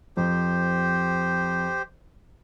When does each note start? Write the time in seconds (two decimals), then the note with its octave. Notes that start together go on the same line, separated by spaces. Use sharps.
0.17 F2 G4 C5